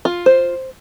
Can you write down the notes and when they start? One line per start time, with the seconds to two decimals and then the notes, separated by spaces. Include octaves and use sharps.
0.05 F4
0.26 C5